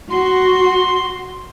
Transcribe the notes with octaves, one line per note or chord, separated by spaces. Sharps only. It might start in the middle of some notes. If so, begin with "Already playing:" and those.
F#4 C6